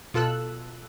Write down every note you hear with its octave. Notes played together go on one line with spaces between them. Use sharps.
B2 F4 A4 E6 F#6